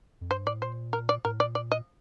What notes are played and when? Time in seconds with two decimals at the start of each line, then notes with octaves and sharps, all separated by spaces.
0.21 F2
0.30 G2 C5
0.46 A2 D5
0.62 A#2 C5
0.93 A#4
1.09 D5
1.25 A2 A#4
1.39 A#2 D5
1.55 D5
1.72 D#5